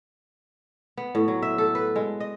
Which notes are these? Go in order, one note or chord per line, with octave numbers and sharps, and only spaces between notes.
B3
A2
F#3
E5
A4
B4
G#3
D#5